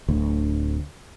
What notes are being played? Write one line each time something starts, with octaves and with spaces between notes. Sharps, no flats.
D1 D2